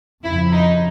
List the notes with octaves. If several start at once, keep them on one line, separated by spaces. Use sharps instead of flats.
F2 C#3 F3 E4
D#4